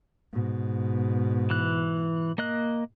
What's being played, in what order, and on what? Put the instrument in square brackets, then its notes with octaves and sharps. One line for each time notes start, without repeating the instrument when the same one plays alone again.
[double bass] G#2 B2
[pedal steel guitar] E3 F#6
A#3 D#5 F#6